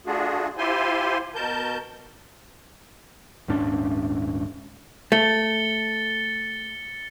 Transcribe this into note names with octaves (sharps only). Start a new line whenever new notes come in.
A3 D4 F4 F#4 G#4
E4 F4 G4 C5 G#5 C6
B2 A#4 A5 G6
D#1 G#2 C#4 D4
A3 A6 C#7 G7